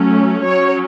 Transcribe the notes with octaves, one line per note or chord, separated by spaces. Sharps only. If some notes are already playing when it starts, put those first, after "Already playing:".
Already playing: F#3 A3 C#4
F#3 C#4 C#5